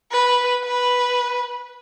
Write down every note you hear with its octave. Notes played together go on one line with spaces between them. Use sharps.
B4
B4